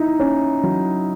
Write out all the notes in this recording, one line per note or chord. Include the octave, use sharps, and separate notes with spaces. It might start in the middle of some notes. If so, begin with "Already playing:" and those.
Already playing: D#4 E4
C#4
F#3